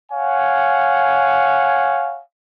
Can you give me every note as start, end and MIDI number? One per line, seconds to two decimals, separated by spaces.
0.12 2.20 73
0.12 2.20 77
0.12 2.20 78
0.12 2.20 80